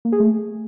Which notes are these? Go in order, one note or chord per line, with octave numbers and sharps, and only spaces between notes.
A#3
G#4
A3